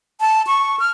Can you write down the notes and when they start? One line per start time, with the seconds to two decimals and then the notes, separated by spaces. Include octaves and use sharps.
0.21 A5
0.47 C#6
0.80 F6